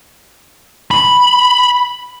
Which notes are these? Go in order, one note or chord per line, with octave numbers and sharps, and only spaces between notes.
B5